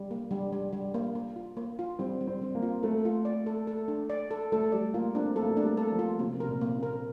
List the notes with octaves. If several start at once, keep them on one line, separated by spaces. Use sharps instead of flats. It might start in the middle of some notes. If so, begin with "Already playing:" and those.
Already playing: G3
A#3
G3 D4
G3
G3
A#3
A#3
F4
A#3
F4
G3 C4
G3
C4
G3
A#3
F4
A3 A4
F4
D5
A4
A4
D4
D5
A4
A3 A4
G3 D5
A#3 F4
C4 D4
A3 A4
A#3
A3
D4
G3
A4
F3
F4
C3 A#3
C3 A#4
A#2
A#3
C3
A#4